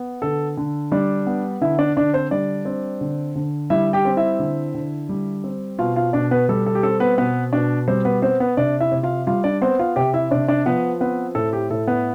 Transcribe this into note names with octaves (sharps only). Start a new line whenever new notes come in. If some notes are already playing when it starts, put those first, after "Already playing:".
Already playing: B3
D3 A4
D3
G3 D4 D5
B3
D3 E4 E5
D4 D5
D3 D4 D5
C4 C5
G3 D4 D5
C4
D3
D3
G3 E4 E5
G4 G5
C4
E4 E5
D3
D3
G3
C4
B2 F4 F5
F4 F5
B2 D4 D5
B3 B4
G3 A4
A4
G4
C4 A4
B3 B4
B2 B3 B4
B2 D4 D5
G3 C4 C5
B3 B4
B3 C4 C5
B3 B4
C3 D4 D5
E4 E5
C3
F4 F5
G3 F4 F5
D4 D5
B3 C4 C5
F4 F5
C3 G4 G5
E4 E5
C3 D4 D5
D4 D5
F3 B3 B4
B3 C4 B4
A2 A4
G4
A2 A4
B3 B4